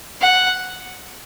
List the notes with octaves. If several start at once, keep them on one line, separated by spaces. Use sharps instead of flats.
F#5